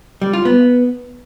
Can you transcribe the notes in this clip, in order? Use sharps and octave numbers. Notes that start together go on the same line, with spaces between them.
G3
F4
B3